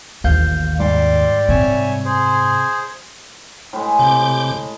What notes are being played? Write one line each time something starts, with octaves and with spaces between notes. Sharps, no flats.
A1 D#2 F5 G6
G#2 G3 C6 D6
C3 C#5 E5 G#5
G#4 C5
A2 G#3
C3 D6 G6